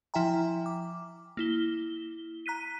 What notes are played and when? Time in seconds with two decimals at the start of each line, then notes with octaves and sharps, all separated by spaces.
0.14 F3 E4 E5 G5 G#5 A#5
0.66 D6
1.37 A#3 E4 G7
2.46 A#5 F#6 B6 D#7